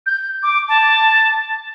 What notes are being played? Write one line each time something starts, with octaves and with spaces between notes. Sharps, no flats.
G6
D6
A5